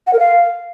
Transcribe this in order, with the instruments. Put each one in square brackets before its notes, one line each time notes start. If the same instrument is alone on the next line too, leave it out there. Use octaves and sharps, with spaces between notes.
[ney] F#5
A#4
F5